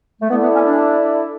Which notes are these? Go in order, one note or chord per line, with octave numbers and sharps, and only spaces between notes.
A3
B3 E4 A4 D5
B3
C#4
D4